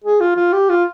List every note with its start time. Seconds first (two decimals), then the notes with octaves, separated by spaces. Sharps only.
0.04 G#4
0.20 F4
0.36 F4
0.53 G4
0.69 F4